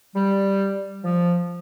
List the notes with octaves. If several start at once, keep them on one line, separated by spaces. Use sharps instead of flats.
G3
F3